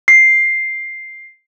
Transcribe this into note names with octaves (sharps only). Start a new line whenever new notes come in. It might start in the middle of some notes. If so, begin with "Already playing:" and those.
C7